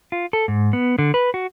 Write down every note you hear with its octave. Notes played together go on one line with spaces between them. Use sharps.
F4
A4
G#2
B3
D3
B4
F#4